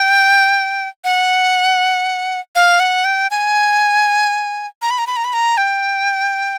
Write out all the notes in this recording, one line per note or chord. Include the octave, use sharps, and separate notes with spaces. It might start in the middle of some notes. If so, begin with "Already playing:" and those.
Already playing: G5
F#5
F5
F#5
G5
G#5
A#5
B5
A#5
B5
A#5
B5
A#5
G5